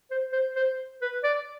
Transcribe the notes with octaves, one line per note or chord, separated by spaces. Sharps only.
C5
C5
C5
B4
D5